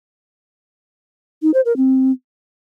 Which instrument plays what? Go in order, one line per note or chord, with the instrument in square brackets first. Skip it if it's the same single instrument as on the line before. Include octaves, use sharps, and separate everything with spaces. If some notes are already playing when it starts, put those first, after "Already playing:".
[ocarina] D#4
C5
A#4
C4